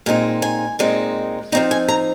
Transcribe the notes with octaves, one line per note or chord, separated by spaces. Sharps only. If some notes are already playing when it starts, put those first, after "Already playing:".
A#2 G#3 C4 D#4
G#5
A#2 G#3 C4 D#4
F3 C4 D#4 A#5
G#5
A#5